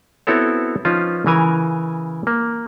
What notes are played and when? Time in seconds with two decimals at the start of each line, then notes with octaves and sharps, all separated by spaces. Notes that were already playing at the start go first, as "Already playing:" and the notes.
0.27 B3 C4 E4 F#4 A4 C#5
0.85 F3 C#4 D#4 F4 B4 C5
1.26 C#3 E3 A#4 G#5 A#5
2.27 A#3